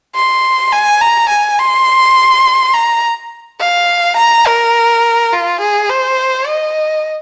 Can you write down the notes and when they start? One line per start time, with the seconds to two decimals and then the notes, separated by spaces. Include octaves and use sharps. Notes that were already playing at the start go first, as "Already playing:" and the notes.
0.16 C6
0.72 G#5
1.01 A#5
1.30 G#5
1.59 C6
2.74 A#5
3.60 F5
4.17 A#5
4.46 A#4
5.33 F4
5.61 G#4
5.90 C5
6.48 D#5